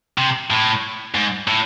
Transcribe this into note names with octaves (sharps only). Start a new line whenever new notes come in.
C3
A2
G#2
A2